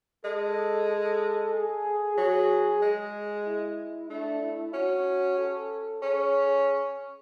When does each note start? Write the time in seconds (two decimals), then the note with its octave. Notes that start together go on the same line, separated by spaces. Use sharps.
0.24 G#3 A4
0.89 A4
1.53 G#4
2.17 F#3 G#4
2.82 G#3 G#4
3.46 E4
4.10 A3 D4
4.42 E4
4.74 C#4 F#4
5.38 A4
6.02 C#4 G#4